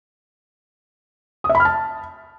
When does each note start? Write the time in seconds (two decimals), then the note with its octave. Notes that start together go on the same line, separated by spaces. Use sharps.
1.44 D#6
1.49 E5
1.55 B5
1.60 F6
1.65 A5